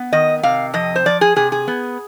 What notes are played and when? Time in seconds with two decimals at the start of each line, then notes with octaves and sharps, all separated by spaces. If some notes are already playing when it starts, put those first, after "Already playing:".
Already playing: B3
0.13 D#3 D#5
0.43 C3 F5
0.74 F2 D#5
0.96 C5
1.06 F3 D5
1.21 G#4
1.36 C3 G#4
1.52 G#4
1.68 B3